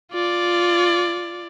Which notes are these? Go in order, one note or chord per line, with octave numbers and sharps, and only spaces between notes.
F4 D5